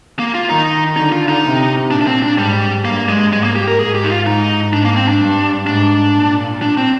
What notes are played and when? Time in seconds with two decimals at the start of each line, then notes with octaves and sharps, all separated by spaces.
0.19 A#3
0.35 F4
0.49 D#3 D#4
0.96 D3 D#4
1.12 F4
1.28 D#4
1.44 C3
1.91 A#2 D4
2.01 D4
2.07 C4
2.22 D4
2.38 G#2 G3
2.85 G2 A#3
3.09 G#3
3.32 G#2 G#3
3.44 A#3
3.56 G4
3.68 A#4
3.79 G#2 G#4
3.95 G4
4.04 D#4
4.10 F4
4.26 G#2 D#4
4.73 G#2 D4
4.85 A#3
4.96 C4
5.09 D4
5.21 G2
5.67 G#2 D4
6.14 A#2
6.62 D4
6.77 C4